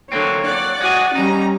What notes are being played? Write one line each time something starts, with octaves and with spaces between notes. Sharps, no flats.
D3 F#3 A#3 C4 C#5
D5 F#5
G#3 F#4 G#4
G3 C#4 D#4 A#5